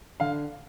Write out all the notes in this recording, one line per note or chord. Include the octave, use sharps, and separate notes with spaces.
D3 F5